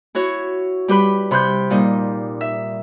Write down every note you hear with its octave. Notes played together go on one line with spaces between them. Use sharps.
E4 F#4 C#5
G3 G4 B4 B5
C3 B5 C6 F#6 G6
A#2 G3 D#4
E5